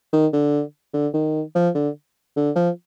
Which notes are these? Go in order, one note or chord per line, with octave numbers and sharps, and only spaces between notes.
D#3
D3
D3
D#3
F3
D3
D3
F3